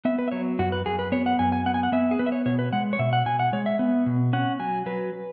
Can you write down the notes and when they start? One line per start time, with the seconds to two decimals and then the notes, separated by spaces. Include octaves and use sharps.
0.05 B3 E5
0.19 B4
0.28 E5
0.32 F#3 C#5
0.59 F#2 F#4
0.72 B4
0.86 F#2 G#4
0.99 B4
1.12 B3 C#5
1.26 F#5
1.39 F#2 G#5
1.52 G#5
1.66 B3 F#5
1.74 G#5
1.83 F#5
1.92 B3 E5
2.11 G#4
2.19 B3 B4
2.26 E5
2.32 C#5
2.46 B2 C#5
2.59 B4
2.73 G#3 F#5
2.93 C#5
2.99 B2 E5
3.13 F#5
3.26 B2 G#5
3.39 F#5
3.53 G#3 C#5
3.66 E5
3.79 B3
4.06 B2
4.33 C#4 F#5
4.59 F#3 G#5
4.86 F#3 B4